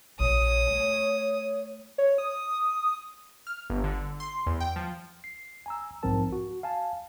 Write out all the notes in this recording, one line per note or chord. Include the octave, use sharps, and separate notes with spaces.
A#1 C#5 D#6
A3
C#5
D#6
F6
G1
D3
C6
E2
G5
F3
C7
G#5 A#5 E6
B1 G#2 F3 C4 A#4 A5
F#4
F5 G#5 A5